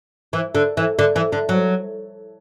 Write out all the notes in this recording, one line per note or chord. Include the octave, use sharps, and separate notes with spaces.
E3
D3
E3
D3
E3
D3
F#3